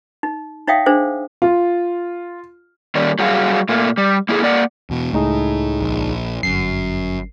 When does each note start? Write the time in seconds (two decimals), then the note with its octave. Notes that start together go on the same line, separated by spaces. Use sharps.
0.23 D#4
0.68 D#4 C#5 E5 F5 G5 D#6
0.86 D4 G#4 C5
1.42 F4
2.95 D#3 G3 A#3 C#4 D5
3.19 F#3 G3 F#4 G#4 F5
3.69 A#2 A3 A#3
3.97 G3
4.29 A#3 E4 F#4 G#4 A4
4.42 A#3 D5 F#5
4.90 E2 B2
5.13 C#2 A2 D#4 G#4
5.81 A#1
6.43 G1 F#2 C7